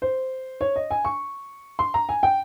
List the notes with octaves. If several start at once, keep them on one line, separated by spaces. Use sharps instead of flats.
C5
C#5
D#5
G#5
C#6
C6
A#5
G#5
G5